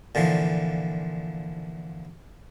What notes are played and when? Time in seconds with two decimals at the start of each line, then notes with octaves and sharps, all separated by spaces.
0.15 A#2 D3 E3 F3